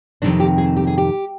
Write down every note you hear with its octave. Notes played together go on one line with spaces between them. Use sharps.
F2 C3 D#3 D4
G4
G#4
G4
G#4
G4